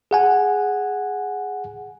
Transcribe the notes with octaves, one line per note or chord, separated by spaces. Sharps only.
G#4 F#5 G#5